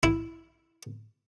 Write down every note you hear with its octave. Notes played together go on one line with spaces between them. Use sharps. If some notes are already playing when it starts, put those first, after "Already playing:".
E4